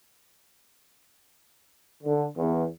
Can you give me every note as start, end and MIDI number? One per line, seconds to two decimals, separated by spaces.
2.03 2.26 50
2.37 2.65 40